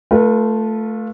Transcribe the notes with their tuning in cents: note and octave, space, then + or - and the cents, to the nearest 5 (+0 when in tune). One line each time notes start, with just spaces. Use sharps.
A3 +0 F4 +0 B4 -40